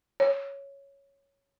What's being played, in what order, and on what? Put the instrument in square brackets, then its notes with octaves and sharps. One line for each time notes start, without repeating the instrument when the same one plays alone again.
[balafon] C#5